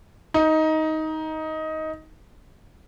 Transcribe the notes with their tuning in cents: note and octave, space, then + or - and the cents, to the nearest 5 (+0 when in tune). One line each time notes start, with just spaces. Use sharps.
D#4 +15